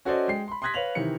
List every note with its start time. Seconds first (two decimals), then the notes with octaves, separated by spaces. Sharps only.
0.05 C#4 F#4 A4 C5 D5 D#5
0.28 G#3 G5 C7
0.48 B5 C6
0.62 C6 D#6 F#6 G#6 A#6 B6
0.74 B4 C#5 F5 F7 F#7
0.95 C3 D#3 E3 C#7